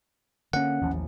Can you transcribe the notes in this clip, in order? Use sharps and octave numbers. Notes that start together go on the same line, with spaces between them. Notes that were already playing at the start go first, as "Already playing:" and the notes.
D3 A#3 C#4 F#5
A1 D#2 F3